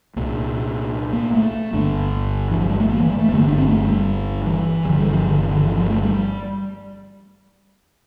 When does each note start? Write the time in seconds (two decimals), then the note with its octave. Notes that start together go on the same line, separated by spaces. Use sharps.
0.16 C2 A#2 A#3
1.13 A#3
1.34 A3
1.72 G1 G2 D3
2.51 E3
2.61 F3
2.70 G3
2.80 A3
2.89 A#3
3.00 E3
3.09 G3
3.19 A3
3.28 G1 G2 D3 A#3
3.39 A#3
3.48 D4
3.58 C4
3.68 A3
3.88 G3
4.46 E3
4.85 G1 G2 D3 F3
4.98 G3
5.12 F3
5.24 D3
5.38 E3
5.50 D3
5.64 E3
5.76 F3
5.90 A3
6.03 G3